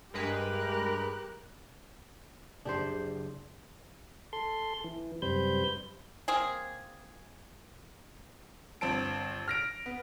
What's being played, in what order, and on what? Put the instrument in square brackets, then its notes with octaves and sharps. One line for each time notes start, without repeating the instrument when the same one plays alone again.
[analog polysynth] G2 G#3 B4 [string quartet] G4 A#4 F#6
[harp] F#1 [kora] D4 G4 C5
[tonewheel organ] A4 C6
E3
F#2 C3 G3 B4 C5 G6
[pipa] A#3 C4 G#4
[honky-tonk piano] G1 C4 A5 D7
F6 A#6 D7
B3